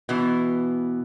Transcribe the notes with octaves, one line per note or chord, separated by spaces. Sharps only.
B2 E3